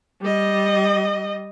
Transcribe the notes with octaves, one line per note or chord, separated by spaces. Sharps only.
G3 D#5